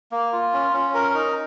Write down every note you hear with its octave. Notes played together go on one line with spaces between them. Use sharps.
A#3
F4
C#4
C#4
A#4
D#4